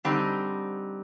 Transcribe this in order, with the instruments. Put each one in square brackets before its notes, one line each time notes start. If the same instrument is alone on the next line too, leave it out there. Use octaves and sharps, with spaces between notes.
[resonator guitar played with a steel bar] D3 G3 C4 D#4